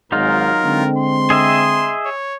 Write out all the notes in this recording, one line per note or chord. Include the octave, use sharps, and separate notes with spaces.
G#1 G#2 F#3 D#4 F4 A#4
D3 G#3 C4
C6
G#4 D#5 E5
C#5